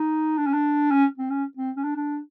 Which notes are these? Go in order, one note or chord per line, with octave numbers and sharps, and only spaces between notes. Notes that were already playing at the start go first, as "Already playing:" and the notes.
Already playing: D#4
D4
C#4
D4
C#4
C4
C#4
C4
C#4
D4
D4